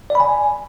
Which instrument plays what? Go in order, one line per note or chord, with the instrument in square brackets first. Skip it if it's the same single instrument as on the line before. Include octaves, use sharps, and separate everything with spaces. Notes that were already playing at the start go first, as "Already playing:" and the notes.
[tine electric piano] D5
B5
G#5